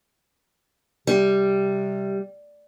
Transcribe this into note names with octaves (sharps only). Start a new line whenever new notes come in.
C3 G3